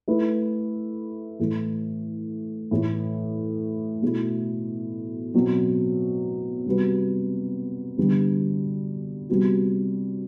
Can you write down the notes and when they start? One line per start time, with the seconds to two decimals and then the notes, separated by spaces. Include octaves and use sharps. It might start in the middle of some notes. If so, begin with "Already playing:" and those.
0.08 A3 E4 B4
1.39 A2 E3 A3
2.71 A2 E3 A3 E4
4.02 B2 A3 E4
5.34 B2 F#3 C4 F#4
6.66 C3 G3 B3 F#4 B4
7.97 D3 G3 B3
9.29 C3 G3 B3 F#4